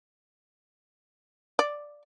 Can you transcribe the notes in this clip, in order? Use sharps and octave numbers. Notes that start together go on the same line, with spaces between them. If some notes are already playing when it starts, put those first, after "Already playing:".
D5